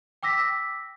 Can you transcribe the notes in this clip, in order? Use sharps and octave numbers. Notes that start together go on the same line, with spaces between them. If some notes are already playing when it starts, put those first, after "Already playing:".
G5 D6 E6 A#6 B6